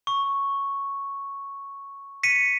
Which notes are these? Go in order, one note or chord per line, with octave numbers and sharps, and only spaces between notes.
C#6
B6 C#7 D#7